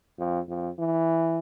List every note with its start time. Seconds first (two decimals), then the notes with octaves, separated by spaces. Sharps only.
0.19 F2
0.48 F2
0.79 E3